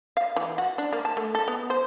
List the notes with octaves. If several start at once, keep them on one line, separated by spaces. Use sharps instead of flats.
F5
E3
F#4
D4
A#3
A5
A3
A4
B3
C5